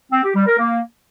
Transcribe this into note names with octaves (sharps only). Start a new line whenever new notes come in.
C4
G4
G3
A#4
A#3